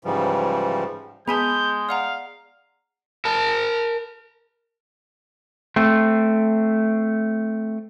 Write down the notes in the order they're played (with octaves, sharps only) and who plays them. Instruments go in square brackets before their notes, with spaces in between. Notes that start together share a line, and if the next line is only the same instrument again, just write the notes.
[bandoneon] G#2 C#3 E3 F3 G3
[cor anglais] G#3 [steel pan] B3 B5 [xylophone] G#4 G#5 A5 [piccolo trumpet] G6
[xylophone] D5 F#5 A#5 [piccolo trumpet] F5
[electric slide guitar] A#4 A5
[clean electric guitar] A3 C4